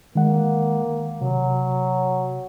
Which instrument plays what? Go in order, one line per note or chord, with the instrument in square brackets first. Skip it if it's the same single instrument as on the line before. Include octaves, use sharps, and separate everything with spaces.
[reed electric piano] D#3 G#3 F#5 [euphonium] A#3
[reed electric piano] C3 [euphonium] F#3